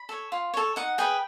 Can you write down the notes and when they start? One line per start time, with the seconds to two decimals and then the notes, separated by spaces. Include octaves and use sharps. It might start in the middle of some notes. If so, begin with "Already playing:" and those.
Already playing: B5
0.09 A4 C#5
0.32 F4
0.54 A4 C#5
0.76 D#4 F#5
0.98 G#4 B4 G5